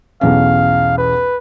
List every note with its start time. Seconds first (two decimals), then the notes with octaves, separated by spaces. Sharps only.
0.21 B1 E2 C#4 F5
0.98 B4